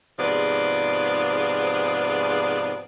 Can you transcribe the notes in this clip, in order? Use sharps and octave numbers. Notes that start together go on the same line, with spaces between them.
G#2 C3 F3 B3 G#4 D5